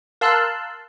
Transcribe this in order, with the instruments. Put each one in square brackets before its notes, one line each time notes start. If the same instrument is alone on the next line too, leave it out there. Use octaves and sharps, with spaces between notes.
[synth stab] A#4 F5 A5 C6 E6 F#6